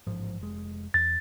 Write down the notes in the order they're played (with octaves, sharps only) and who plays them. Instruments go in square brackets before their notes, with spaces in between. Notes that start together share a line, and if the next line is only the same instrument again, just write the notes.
[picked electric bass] A1 G#2 F3
F1 G#3
[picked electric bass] E2 [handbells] A6